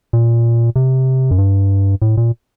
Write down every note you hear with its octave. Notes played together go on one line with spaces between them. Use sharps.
A#2
C3
F#2
G2
A2
A#2